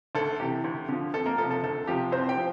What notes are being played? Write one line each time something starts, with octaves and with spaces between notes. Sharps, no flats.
D2 A4
C3 E3 G4
D2
D3 F3
F2 A4
A#3 A#4
C3 F3 A4
A4
D2 A4
C3 F3 G4
C2 C4 C5
G4 G5
F3